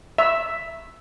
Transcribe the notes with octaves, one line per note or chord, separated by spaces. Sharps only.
E5